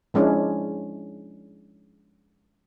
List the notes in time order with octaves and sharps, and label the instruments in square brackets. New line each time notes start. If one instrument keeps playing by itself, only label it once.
[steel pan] F3 G#3 C#4 D4 E4